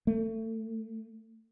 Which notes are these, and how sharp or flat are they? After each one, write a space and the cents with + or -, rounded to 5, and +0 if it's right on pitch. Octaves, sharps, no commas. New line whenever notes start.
A3 +25